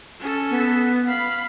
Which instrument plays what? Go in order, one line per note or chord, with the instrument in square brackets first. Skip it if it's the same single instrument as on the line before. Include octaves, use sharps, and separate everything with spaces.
[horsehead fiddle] C#4 A4
[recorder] B3
[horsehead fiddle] F5 B5